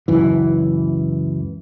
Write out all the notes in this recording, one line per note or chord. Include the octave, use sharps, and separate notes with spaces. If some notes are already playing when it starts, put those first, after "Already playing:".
C#2 F#2 E3